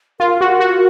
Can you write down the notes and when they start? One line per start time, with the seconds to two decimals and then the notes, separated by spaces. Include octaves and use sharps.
0.20 F4 A#4
0.41 F#4
0.60 F#4